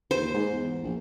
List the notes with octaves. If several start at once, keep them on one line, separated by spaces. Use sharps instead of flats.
D#2 C5
G#2
E2
A#1